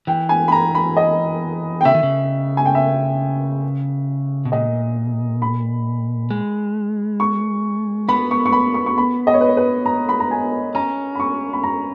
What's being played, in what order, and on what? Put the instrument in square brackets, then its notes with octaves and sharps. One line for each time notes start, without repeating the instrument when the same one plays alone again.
[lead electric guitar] E3 [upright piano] G5
[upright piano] G#5
B5
A#5
B5
D#5
G5
[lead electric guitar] C#3 [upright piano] E5
[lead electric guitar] D#3
C#3
[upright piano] G#5
G5
E5
[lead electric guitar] B2
[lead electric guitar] A#2 [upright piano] D#5
[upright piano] B5
[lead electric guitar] G#3
[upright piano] C#6
[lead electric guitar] B3 [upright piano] B5
[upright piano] C#6
C#6
B5
C#6
C#6
B5
D#5
C#5
B4
C#5
B4
A#5
B5
A#5
G#5
[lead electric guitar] C#4 [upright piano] A#5
[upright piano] B5
C#6
B5
A#5